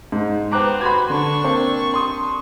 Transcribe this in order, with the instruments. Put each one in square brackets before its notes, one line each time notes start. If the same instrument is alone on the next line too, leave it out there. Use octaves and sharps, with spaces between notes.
[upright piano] G#2
[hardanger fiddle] B3 C4 [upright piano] A#5 D6 F#6
[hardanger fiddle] F#4 [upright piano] B5 C6 G#6
[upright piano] D3 [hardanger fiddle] D4 C#6
[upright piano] A#3 C4
C6 D#6